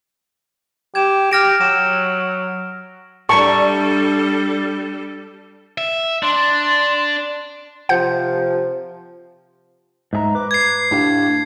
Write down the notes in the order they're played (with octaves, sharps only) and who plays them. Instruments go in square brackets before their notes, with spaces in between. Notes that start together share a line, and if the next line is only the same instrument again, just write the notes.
[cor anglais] G4 [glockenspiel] G#6 E7
[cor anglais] G4 [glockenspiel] F6 A#6 D7
[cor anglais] F#3 [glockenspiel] E7
[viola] G3 A4 [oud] D4 E4 A#4 [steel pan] A5 C#6
[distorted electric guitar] E5
[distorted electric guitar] D4 [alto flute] C6
[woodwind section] C3 F3 [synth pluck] F#5 G6
[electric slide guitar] G#2 G#4 A#5 [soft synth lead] E5
[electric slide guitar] B4 [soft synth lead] D6
[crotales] G#6 C7
[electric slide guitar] A2 G4 F5 [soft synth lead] D4